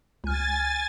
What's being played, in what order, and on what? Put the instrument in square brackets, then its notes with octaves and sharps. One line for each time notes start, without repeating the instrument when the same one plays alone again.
[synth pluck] C#2 F6 [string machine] G#5 A6